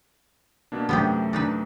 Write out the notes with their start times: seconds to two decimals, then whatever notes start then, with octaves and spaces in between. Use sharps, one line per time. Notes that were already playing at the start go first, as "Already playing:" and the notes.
0.72 B2 A#3 D4
0.89 F#2 C3 A3 B3 D4 G4
1.33 D4 D#4 B4